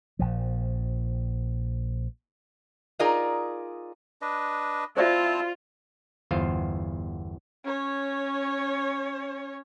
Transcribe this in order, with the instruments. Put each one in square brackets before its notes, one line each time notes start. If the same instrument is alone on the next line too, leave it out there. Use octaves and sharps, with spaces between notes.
[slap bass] A#1 F3
[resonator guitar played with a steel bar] D#4 F4 G#4 A#4 D5
[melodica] D4 B4 D#5
[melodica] C4 E4 A5 [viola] F4 [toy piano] C5 D5 E5
[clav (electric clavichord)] G1 E2 F4 C5 F5
[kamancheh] C#4 C#5